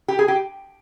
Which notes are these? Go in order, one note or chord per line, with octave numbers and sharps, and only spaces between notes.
G4
G#4
G4